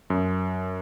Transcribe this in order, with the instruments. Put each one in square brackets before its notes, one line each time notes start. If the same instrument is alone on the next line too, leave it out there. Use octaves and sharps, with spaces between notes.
[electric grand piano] F#2